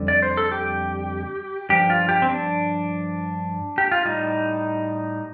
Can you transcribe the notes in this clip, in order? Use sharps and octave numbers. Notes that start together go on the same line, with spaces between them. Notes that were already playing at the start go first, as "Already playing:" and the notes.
Already playing: F2 D3 G3
D5
C5
A4
G4
G2 F3 G4
F4
G4
C4
D4
G4
F4
A2 G3 D#4